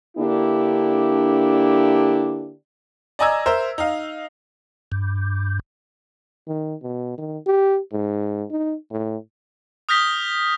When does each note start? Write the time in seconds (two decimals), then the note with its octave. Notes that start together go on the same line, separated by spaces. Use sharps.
0.17 D3 A#3 D4 E4 G4
3.19 D5 D#5 G#5 A#5 E6 G#6
3.46 A#4 C5 E5
3.78 D#4 F5
4.92 G2
6.48 D#3
6.83 B2
7.18 D#3
7.46 G4
7.92 G#2
8.50 D#4
8.91 A2
9.89 D#6 F6 G6 A#6 B6 G7